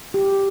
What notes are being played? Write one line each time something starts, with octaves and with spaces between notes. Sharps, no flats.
G4